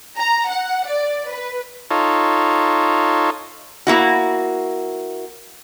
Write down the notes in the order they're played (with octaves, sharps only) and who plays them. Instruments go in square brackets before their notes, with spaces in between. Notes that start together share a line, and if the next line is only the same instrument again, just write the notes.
[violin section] A#5
F#5
D5
B4
[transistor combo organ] D#4 F4 A4 C#5
[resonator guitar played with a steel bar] A#3 E4 F#4